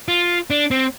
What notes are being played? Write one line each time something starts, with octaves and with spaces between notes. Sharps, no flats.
F4
D4
C4